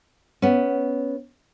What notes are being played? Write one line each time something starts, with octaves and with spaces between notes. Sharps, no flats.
B3 C#4